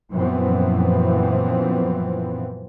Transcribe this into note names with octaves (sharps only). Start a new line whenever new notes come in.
F#2 A#2 E3 F3 B3 C4